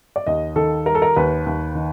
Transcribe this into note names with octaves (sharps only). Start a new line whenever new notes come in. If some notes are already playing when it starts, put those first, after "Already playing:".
D5
D#2 D#5
D#3 A4
G3 A#4
A4
A#4
D#2 B4
D#2
D#3